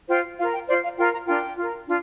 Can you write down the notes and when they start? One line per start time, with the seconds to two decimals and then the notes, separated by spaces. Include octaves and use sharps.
0.08 F4 C5 G5
0.38 F4 A#4 F5
0.54 G5
0.67 F4 C5 D5
0.83 F5
0.98 F4 A#4 G5
1.13 A#5
1.27 D4 F4 A#4 G5
1.57 F4 A#4
1.86 D4 F4